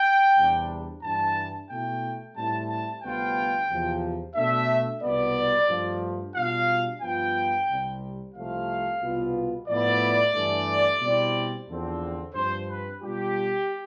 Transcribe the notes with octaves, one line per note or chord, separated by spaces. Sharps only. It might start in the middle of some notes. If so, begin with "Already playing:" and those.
Already playing: G5
E2 C3 G3 D4
G2 E3 G3 D4 A5
B2 A3 E4 G5
A2 G3 C4 E4 A5
A5
D2 C3 G3 B3 F4 G5
E2 C3 F3
B2 A3 D4 E5
C2 B2 B3 D5
G2 F3 A3
B2 G3 D4 F4 F5
G2 F3 B3 F4 G5
C2 C3 G3
C2 C3 F3 A3 C4 F5
C2 B2 B3 F4
A2 F3 B3 E4 D5
G2 E3 A3
B2 G3 C4 E4
E2 D3 F3 C4
G2 F3 C4 C5
B4
B2 G3 D4 F4 G4